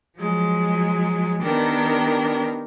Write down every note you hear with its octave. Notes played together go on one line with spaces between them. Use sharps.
F3 F#3 G#3
D#3 B3 D4 G4 A#4